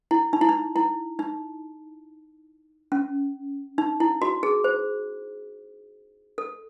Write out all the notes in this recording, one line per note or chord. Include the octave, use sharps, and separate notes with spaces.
E4
D#4
E4
D#4
E4
D#4
C#4
D#4
E4
F#4
G#4
C5
A4